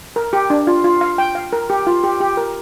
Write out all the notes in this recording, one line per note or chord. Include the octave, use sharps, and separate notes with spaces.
A#4
G4
D4
F4
F4
F5
G5
F5
A#4
G4
F4
G4
G4
A#4